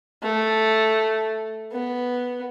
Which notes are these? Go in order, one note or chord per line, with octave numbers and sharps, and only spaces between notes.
A3
B3